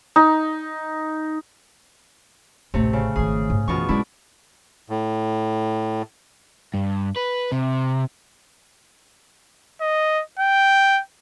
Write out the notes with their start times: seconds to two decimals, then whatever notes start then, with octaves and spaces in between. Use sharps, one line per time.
0.16 D#4
2.74 A1 D2 C3 A3
2.93 C#3
3.16 G#1 D#3 G#4
3.50 G#2 C3
3.68 F#2 B2 E3 F4 C#6
3.89 G#3 C#4 D4 E4
4.90 A2
6.74 G2
7.16 B4
7.52 C3
9.81 D#5
10.39 G5